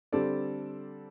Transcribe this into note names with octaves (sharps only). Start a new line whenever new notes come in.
D3 G3 C4 A4 D5